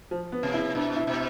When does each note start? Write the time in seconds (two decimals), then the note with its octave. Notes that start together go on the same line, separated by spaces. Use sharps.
0.11 F3
0.32 B3
0.43 C3
0.54 E4
0.75 B2 D4
0.96 E4
1.07 B2